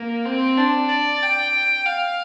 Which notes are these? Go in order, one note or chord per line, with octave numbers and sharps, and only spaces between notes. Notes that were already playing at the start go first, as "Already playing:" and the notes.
Already playing: A#3
C4
D4
D5
G5
F5